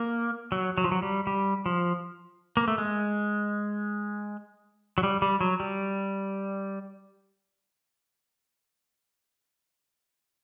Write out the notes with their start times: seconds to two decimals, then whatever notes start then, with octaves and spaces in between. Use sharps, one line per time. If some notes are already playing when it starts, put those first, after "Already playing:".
Already playing: A#3
0.52 F#3
0.78 F#3
0.84 F3
0.92 F#3
1.02 G3
1.27 G3
1.66 F3
2.57 A#3
2.68 A3
2.78 G#3
4.98 F#3
5.03 G3
5.22 G3
5.41 F#3
5.60 G3